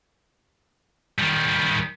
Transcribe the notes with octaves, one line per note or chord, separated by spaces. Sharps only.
D#3 G3